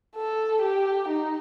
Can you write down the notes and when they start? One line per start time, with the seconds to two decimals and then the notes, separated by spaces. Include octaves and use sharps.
0.16 A4
0.62 G4
1.08 D#4